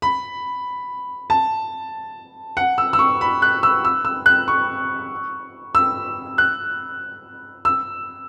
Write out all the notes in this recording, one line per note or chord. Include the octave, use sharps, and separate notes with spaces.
B5
A5
F#5
E6
E6
C#6
B5
F#6
E6
E6
E6
F#6
C#6
E6
F#6
E6